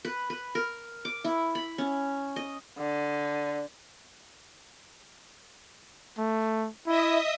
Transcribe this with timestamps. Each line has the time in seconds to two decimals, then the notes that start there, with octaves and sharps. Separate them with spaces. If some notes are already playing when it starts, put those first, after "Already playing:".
0.05 B4
0.30 B4
0.55 A#4
1.05 D6
1.24 E4
1.55 B5
1.78 C#4
2.36 D#5
2.78 D3
6.18 A3
6.86 E4 D#5 E5 D#6